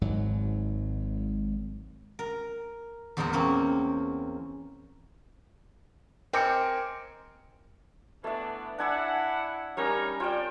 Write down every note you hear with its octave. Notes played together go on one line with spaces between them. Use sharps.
G#1 G#2 F#3
A#4
E2 A#2 G#3 A#4 C5 F#5
A#3 C4 C#4
C4 A#4 D#5 G#5 D6 C#7
E3 A3 B3 D4 E5
D4 E4 F#5 G#5 E6
G3 C#4 D#4 A#4 C#5 A#5
C4 F4 C#5 D5 G5